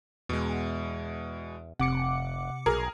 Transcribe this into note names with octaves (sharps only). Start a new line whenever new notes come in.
E2 B2 G#3
F1 C3 F#5 D6 C#7
B1 G#4 A#4 A#5